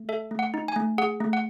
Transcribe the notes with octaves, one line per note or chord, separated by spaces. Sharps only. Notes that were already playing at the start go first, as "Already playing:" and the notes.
Already playing: A3
A4 E5
A3
F#5
D#4
G#5
A3
G#4 F#5
A3
F#5